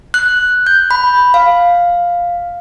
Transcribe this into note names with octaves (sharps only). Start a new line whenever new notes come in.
F#6
G6
B5
F5